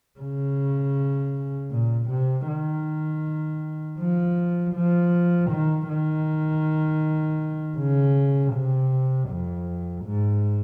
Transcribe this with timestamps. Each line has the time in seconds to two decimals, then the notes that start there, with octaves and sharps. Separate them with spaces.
0.20 C#3
1.71 A#2
2.10 C3
2.47 D#3
3.99 F3
4.75 F3
5.51 D#3
5.88 D#3
7.78 C#3
8.54 C3
9.29 F2
10.05 G#2